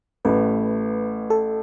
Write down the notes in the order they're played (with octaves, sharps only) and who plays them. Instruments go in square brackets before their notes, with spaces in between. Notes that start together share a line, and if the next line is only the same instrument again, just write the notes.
[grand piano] A1 A2 A3 [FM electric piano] B4
[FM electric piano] A4